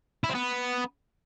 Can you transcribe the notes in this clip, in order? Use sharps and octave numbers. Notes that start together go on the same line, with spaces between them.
E4
C4
B3